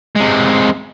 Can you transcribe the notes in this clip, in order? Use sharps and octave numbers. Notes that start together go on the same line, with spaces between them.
C3 G#3